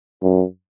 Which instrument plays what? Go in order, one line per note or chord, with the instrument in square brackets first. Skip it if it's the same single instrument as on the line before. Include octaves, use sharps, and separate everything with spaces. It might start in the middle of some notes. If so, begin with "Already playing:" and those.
[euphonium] F#2